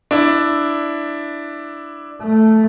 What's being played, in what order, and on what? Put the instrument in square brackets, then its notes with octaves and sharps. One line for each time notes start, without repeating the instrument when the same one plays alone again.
[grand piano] D4 E4
[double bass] A3